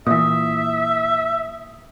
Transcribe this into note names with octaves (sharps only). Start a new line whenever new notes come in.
A#2 E3 E5 D#6